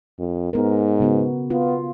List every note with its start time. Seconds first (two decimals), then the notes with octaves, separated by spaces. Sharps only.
0.19 F2
0.53 G#2 B3 A#4
1.00 C#3 B3 F#4
1.50 B3 F4